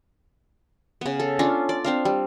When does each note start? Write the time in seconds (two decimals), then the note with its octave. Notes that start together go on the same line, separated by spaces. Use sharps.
1.01 C#3 B3
1.20 A4
1.39 C#4 D4 F4
1.69 D5
1.85 C4 D4 F5
2.05 G3